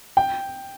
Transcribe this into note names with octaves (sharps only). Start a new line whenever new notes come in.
G5